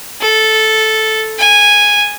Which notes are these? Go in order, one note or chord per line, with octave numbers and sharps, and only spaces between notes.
A4
G#5